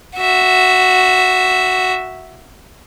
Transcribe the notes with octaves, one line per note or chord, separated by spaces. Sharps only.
F#4 E5